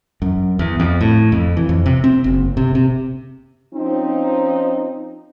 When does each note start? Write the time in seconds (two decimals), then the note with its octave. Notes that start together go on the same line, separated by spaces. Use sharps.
0.22 F#2
0.59 E2
0.80 F2
1.01 A2
1.32 F2
1.57 E3
1.69 F2
1.86 C3
2.04 C4
2.24 F#1
2.57 C3
2.75 C3
3.74 F3 C4 C#4 D#4